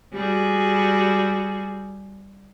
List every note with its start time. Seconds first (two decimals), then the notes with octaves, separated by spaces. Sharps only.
0.14 G3 F#4 G#4